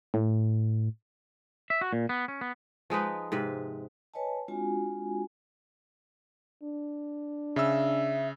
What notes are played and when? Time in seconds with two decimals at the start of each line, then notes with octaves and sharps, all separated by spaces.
0.14 A2
1.70 E5
1.81 F#4
1.93 A#2
2.09 B3
2.28 C#4
2.41 B3
2.90 F3 G#3 D#4 B4
3.32 G#2 C3 B4
4.14 B4 C#5 D#5 G#5 A5
4.48 G#3 C4 D4 F4 F#4 G#5
6.63 D4
7.56 C#3 E5 E6